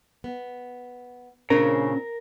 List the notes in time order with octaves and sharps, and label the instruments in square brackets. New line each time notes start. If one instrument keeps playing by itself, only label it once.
[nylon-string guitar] B3
[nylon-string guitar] A#2 C4 D4 [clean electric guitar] C#3 [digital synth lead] A#4